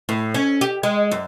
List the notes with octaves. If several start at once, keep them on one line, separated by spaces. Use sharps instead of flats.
A2
C#4
G4
G#3
F#2